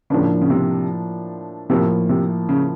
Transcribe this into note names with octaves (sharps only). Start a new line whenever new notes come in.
A2 C#3 F3 A#3 D4
C#3
C3
A2 C3 F3 A#3
C3
C#3